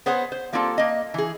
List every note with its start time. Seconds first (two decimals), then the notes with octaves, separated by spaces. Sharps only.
0.06 B3 G#4 C5 C#5 F#5
0.32 C5
0.53 G3 A#3 C4 F4 G#4 A4
0.78 A#3 D#5
1.14 E3 G#4